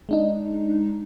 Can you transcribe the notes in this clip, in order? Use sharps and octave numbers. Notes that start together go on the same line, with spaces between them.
G#3 D4 D#4